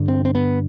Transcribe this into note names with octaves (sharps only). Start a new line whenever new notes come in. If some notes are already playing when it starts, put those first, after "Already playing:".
Already playing: G2 D3
C4
C4
B3